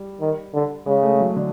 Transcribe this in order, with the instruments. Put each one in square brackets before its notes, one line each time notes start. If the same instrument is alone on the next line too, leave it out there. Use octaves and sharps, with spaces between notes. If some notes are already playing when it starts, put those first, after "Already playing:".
Already playing: [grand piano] G3
[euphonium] D#3
D3
[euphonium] C#3 [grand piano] G#3
[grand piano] A3
F#3
D3